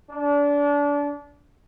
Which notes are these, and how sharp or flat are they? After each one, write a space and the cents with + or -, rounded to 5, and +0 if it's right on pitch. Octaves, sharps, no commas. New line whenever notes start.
D4 -30